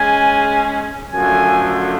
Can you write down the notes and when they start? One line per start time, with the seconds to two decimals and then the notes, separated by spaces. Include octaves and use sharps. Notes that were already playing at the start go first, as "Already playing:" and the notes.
Already playing: G#3 C#4 G#4 G#5
1.13 F#2 D3 F3 A3 G#5